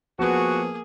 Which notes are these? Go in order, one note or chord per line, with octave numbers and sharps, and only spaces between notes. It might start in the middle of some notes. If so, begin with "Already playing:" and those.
F3 A#3 B3 F#4 G#4 B4